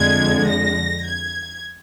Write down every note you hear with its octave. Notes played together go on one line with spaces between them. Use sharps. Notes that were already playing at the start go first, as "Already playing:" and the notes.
Already playing: F2 D3 G#3 G#6
A#6
G#6